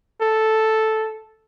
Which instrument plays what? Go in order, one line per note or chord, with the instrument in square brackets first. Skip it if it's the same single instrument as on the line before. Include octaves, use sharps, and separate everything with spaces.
[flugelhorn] A4